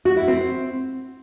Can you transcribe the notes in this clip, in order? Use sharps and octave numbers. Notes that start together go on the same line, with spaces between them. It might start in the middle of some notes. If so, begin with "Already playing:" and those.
F#4
E4
C4